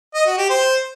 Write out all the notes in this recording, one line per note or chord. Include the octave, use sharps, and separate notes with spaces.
D#5
F#4
G4
C5